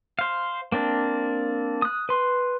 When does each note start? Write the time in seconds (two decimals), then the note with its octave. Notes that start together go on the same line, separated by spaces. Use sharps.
0.19 C5 F5
0.72 A#3 C4 D4
1.82 D#6 F#6
2.09 B4 C6